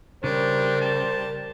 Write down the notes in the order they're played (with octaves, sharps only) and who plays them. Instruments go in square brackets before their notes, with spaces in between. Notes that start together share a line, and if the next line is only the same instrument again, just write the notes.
[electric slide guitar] C#3 [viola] G3 A#4 [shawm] D4 [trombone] C5
[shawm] A5